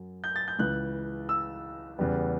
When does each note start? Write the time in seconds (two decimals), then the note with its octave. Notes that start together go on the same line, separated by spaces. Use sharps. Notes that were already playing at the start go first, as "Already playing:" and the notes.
Already playing: F#2 F#3
0.24 G6
0.36 A6
0.48 G6
0.59 C#2 C#3 E3 F#6
1.29 E6
1.98 E2 C#3 G3 B3